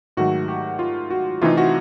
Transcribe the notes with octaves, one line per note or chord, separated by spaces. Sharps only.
G#2 D#3 F#3 A3 F#4
G4
F4
F#4
C3 E3 A3 C4 D#4 F4
F#4